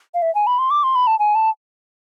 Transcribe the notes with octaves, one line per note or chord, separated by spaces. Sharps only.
F5
E5
G#5
B5
C6
D6
C6
B5
A5
G#5
A5